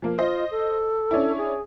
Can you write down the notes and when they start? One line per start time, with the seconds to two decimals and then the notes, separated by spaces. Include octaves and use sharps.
0.02 F3 A#3
0.18 F4 C5 D#5
0.51 A4
1.11 C#4 D4 E4
1.38 G#4